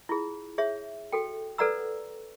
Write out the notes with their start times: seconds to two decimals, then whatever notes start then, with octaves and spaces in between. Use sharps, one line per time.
0.09 E4 F4 G#4
0.58 G#4 C#5 E5
1.12 F#4 A4 G5
1.58 A4 B4 D5 F#5 A#5 E6